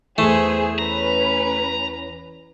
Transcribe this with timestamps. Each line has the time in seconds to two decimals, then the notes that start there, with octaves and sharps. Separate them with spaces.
0.18 E2 E3 A3 G#4 C5
0.79 C#4 B4 A#5